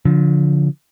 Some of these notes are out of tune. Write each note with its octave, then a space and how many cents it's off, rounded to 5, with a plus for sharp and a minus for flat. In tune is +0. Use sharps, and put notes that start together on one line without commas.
D3 -35 F3 +0